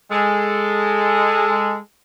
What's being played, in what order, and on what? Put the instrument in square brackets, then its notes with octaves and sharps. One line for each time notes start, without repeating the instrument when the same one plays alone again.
[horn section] G#3 A4